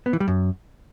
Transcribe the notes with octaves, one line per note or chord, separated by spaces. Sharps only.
B3
E3
G3
F#2